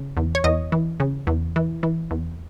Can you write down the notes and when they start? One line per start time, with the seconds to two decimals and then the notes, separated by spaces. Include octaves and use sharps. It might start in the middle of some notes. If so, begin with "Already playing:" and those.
Already playing: C#3
0.17 E2
0.35 C#5
0.44 E2 D#5
0.72 E3
1.00 C#3
1.27 E2
1.56 E3
1.83 E3
2.11 E2